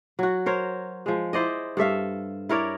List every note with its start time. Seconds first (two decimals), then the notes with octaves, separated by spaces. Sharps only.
0.19 F#3 F#4
0.46 A#4 C5 C#5
1.06 F3 G#3
1.33 E4 C5 D5 D#5
1.77 G2 A4 E5 F5
2.49 E4 A#4 C#5 D5